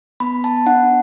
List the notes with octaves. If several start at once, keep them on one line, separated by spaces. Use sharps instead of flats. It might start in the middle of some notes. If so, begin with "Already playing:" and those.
B3 B5
A5
D4 F#5